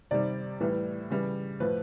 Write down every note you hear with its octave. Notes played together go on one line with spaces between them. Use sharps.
C3 D#3 G3 D5
A2 E3 G3
C#3 E3 G3
A2 F3 B4